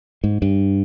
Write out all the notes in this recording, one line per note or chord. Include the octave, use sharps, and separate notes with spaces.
G#2
G2